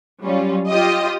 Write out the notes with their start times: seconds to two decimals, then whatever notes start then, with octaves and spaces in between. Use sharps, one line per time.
0.23 F#3 G3 C#4 F4
0.69 F4 G4 D#5